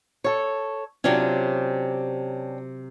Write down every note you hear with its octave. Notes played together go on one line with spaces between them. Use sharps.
A4 C#5 C#6
C3 F#3 C#4 D4 F4 G4